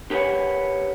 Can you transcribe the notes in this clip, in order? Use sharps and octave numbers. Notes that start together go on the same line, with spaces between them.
G4 A#4 B4 C#5 F#5